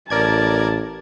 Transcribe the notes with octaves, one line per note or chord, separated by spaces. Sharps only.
A1 A#4 D5 A5 G#6